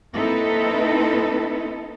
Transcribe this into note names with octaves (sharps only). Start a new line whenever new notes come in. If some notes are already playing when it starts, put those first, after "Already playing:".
A#3 C4 D#4 E4 A4 B4